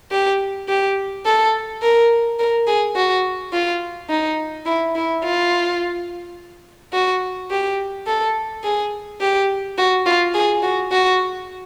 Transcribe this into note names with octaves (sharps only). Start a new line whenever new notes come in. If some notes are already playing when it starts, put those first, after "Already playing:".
G4
G4
A4
A#4
A#4
G#4
F#4
F4
D#4
E4
E4
F4
F#4
G4
A4
G#4
G4
F#4
F4
G#4
F#4
F#4